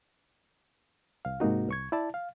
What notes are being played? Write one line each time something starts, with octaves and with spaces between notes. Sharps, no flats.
C2 F5
G#2 C3 A#3 D#4 F#4
C2 C#6 G#6
E4 D5 A5
F5